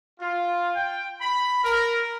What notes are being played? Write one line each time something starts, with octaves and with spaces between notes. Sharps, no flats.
F4
G5
B5
A#4